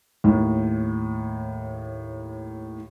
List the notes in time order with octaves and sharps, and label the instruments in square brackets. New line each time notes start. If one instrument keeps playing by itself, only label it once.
[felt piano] D#2 A2